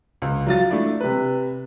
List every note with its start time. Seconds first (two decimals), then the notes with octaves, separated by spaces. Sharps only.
0.22 C#2
0.46 F#3 F4 A6
0.70 A3 D4 E4
1.01 C3 B4